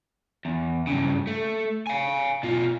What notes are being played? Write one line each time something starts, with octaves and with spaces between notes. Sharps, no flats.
E2
G2 C#3
A3
F5 G#5
B2 F4